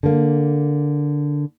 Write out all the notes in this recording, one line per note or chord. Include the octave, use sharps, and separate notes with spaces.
D3 A#3